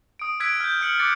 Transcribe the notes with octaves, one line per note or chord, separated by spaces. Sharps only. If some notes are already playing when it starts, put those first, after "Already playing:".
D#6 D7
E6 F#6 G#6 B6 D7
F6 G6
F6 C#7 F#7
D6 F#6 A6 C#7